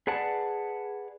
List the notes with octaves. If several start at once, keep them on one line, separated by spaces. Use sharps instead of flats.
G#4 B4 D5 F#5 A5